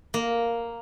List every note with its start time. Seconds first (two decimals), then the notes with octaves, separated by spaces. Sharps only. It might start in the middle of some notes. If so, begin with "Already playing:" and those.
0.14 A#3